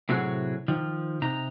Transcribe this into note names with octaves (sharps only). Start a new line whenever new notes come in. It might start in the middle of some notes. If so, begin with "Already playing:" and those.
A2 C3 F#3 F#4 G#4
D#3 F3
C3 D#4 A#5